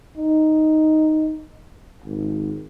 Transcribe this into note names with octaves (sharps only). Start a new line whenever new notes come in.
D#4
G#1